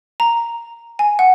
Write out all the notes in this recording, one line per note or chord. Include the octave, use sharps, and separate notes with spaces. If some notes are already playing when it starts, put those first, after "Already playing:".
A#5
G#5
F#5